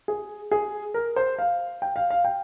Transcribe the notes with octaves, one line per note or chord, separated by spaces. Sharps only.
G#4
G#4
A#4
C5
F5
G5
F5
F5
G5